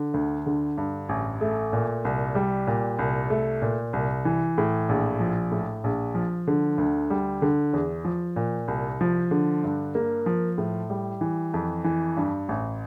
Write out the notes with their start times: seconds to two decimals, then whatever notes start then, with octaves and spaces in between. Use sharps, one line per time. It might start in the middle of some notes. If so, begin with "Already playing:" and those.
Already playing: D3
0.14 D2
0.46 D3
0.78 G2
1.09 A1
1.41 A3
1.73 A#2
2.05 C2
2.35 G3
2.67 A#2
2.99 C2
3.30 A3
3.62 A#2
3.93 C2
4.25 E3
4.58 A2
4.89 A#1
5.20 F3
5.51 A2
5.84 A#1
6.15 F3
6.47 D3
6.78 D2
7.10 G3
7.42 D3
7.74 E2
8.05 F3
8.36 A#2
8.68 C2
9.01 F3
9.31 D3
9.64 G2
9.95 A#3
10.26 F3
10.58 A2
10.90 G3
11.21 E3
11.54 F2
11.84 E3
12.17 G2
12.49 A1